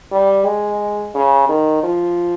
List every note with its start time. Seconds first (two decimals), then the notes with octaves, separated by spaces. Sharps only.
0.12 G3
0.46 G#3
1.14 C#3
1.49 D#3
1.83 F3